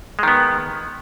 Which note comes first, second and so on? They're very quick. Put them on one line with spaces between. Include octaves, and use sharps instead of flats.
G#3 D#3 B3